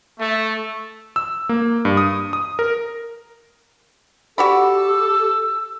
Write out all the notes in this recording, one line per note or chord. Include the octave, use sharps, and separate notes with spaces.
A3
E6
A#3
G2
D#6
D#6
A#4
F#4 G4 A4 D5 B5 E6